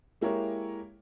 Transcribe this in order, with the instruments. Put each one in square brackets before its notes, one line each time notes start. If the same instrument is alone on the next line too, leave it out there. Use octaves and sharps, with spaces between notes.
[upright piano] G#3 A#3 E4 G4 A#4 C#5